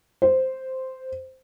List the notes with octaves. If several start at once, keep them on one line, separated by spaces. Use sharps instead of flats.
C5